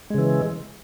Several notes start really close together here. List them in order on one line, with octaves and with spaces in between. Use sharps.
G#3 C#3 E3